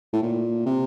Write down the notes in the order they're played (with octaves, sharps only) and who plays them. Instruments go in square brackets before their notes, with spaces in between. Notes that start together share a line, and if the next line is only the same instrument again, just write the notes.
[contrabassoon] A2
A#2
C3